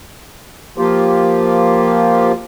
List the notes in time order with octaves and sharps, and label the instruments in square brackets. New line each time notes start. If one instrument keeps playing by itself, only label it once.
[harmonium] F3 A#3 F4 G4